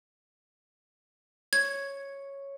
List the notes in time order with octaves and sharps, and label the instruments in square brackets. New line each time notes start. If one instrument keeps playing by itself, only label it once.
[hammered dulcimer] C#5 [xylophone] G#6